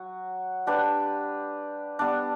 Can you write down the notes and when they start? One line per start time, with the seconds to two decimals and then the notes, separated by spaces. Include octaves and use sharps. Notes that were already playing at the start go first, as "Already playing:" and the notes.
Already playing: F#3 F#4
0.67 G3 D4 G4 B4
1.99 G3 B3 D4